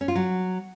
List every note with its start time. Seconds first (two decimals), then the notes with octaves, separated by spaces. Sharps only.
0.01 C#4
0.08 F4
0.15 F#3